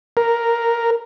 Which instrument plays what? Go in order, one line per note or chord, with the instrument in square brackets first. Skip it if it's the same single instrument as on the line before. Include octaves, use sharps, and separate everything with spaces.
[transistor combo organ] A#4